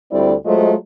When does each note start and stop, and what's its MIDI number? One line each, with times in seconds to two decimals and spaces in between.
0.12 0.34 38
0.12 0.34 55
0.12 0.34 60
0.12 0.34 64
0.12 0.34 69
0.12 0.34 74
0.45 0.74 54
0.45 0.74 56
0.45 0.74 57
0.45 0.74 65
0.45 0.74 72
0.45 0.74 75